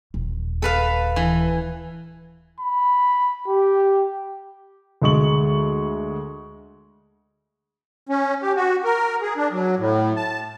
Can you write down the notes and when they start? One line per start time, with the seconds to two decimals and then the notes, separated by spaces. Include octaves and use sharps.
0.14 D#1
0.62 A4 B4 F5
1.16 E3
2.60 B5
3.48 G4
5.02 D2 G#3 C#6 F#7
8.09 C#4
8.42 G4
8.56 F#4
8.84 A#4
9.22 G#4
9.37 D4
9.52 F#3
9.78 A2
10.16 A5